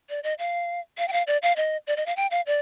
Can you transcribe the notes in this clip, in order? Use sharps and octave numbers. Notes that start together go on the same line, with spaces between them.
D5
D#5
F5
F5
G5
F5
D5
F5
D#5
D5
D#5
F5
G5
F5
D5